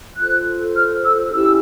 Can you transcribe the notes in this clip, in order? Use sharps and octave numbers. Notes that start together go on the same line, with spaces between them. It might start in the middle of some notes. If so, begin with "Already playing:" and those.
F4 A4 C5 F#6
F6
E6
C#4 E4 G4 E6